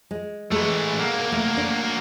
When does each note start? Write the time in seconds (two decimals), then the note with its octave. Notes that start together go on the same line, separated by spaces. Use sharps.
0.11 G#3
0.52 E3 G#3 A3
0.99 F#3 A#3
1.32 A3
1.57 D4